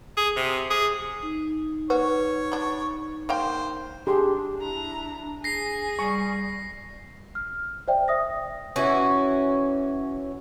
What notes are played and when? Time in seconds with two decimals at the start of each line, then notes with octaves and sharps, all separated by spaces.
0.17 G#4
0.36 C3
0.70 G#4
1.23 D#4
1.90 F#4 B4 C#5
2.52 G3 D4
3.29 A#3 C5 F5 G5
4.07 D4 G4 G#4 C6
4.61 E4 A#5
5.44 G#4 G#5 A#6 C7
5.99 G3 C#6
7.35 F6
7.88 C5 D5 E5 G5
8.08 E5 D#6 A#6
8.76 E3 C#4 F#4